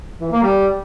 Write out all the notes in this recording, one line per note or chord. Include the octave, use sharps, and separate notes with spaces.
E3
A#3
G3